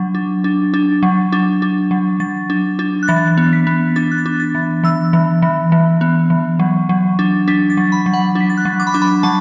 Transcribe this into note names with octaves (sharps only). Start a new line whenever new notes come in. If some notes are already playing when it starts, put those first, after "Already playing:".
Already playing: F#3 D4
D4
D4
D4
F#3
D4
D4
F#3
F#3 A6
D4
D4
F#6
E3 A6
B3
B6
B3
D4 A6
F#6
A6
D4
A6
E3
E3 E6
E3
E3
E3
B3
E3
F#3
F#3
D4
D4 B6
A6
F#3
B5
F#3
F#5
D4
B6
A6
F#6
F#3
D6
B5
D4 D6
B5
F#3 A5